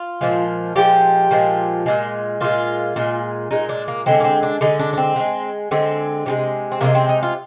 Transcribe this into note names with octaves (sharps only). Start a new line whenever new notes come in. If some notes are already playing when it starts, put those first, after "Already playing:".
Already playing: F4
A#2 F3 G#3
A#2 F3 G#3 G4
A#2 F3 G#3
A#2 G#3
A#2 G#3 F4
A#2 G#3
A#2 G#3 D#4
D4
A#3
D3 G#3 C4
A#3
C4
D4
D3 G#3 D#4
D4
D4
C4
D3
G#3
D3 G#3 C4
C3 D#3 G#3
C4
C3 D#3 G#3 A#3
C4
D#4
F4